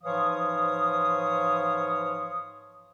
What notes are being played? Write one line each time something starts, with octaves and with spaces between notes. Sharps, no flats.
G#2 E3 F3 C#5 F5 D#6